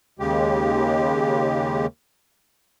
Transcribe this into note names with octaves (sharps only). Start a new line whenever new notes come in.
D#2 C#3 G#3 G4